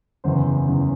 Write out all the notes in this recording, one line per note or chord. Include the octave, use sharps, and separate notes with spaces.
F#1 E2 C#3 E3 C5
F#1 E2 C#3 E3